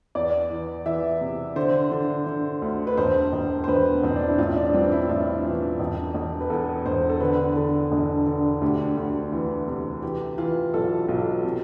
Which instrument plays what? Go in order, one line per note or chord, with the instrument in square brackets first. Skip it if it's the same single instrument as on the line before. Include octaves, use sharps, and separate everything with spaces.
[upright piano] E2 D5
E3
E3 E5
C3
D3 C5
D3
D3
D2
B4
E1 C5
E1
C5
E1 B4
B3
E1 C4
D4
E4
A1 F4
D4
G2 C4
E4
A1 F4
E3
E1
E1
B4
E2 A4
E1 C5
A4
D3 B4
D3
E1
D3
D2 G4
D2
E3
C3
E3 G4
E3 F4
B1 A4
B1
C3